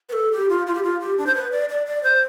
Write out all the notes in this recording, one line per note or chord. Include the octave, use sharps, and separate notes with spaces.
B4
A4
G4
F4
F4
G4
F4
G4
D4
C5
B4
D5
D5
D5
C5